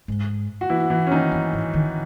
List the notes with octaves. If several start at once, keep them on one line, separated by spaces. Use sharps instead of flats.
G#2
F#4
E3 E4
E3 E4
C#4
D#3 D#4
F#2
G#2
D#3